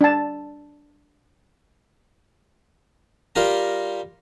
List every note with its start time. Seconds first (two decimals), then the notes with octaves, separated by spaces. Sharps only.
0.01 D4 A5
3.36 G3 F4 G4 A#4 A#5